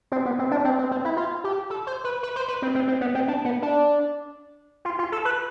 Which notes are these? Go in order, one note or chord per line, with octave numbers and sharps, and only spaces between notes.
C4
B3
C4
D4
C4
C4
C4
E4
F4
G4
A4
C5
B4
B4
C5
B4
C4
C4
C4
B3
C4
D4
B3
D4
F4
F4
A4
B4